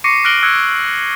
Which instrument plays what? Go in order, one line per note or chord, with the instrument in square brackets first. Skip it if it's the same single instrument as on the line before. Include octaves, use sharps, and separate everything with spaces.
[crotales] C#6 D6 A#6 C7 C#7 D#7
F6 F#6 A#6 D7 F#7 G7
E6 F#6 G#6 C#7